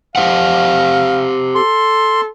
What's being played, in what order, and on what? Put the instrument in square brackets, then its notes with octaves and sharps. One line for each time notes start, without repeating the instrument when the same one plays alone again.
[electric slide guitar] G4 C5 F#5 [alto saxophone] F5
[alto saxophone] A4 [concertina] C6